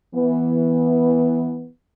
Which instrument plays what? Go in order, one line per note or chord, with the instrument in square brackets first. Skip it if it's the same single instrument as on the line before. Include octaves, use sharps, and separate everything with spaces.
[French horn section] E3 B3